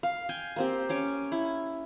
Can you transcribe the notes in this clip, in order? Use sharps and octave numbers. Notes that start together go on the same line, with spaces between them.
F5
G5 G#5
A#3 C4 G4
C#4 C#5 D6
E4